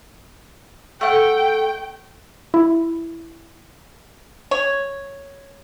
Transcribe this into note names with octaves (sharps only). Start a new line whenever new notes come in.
A3 F#5 G5
E4
C#5